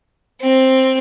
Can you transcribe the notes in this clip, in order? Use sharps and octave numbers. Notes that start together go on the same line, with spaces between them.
C4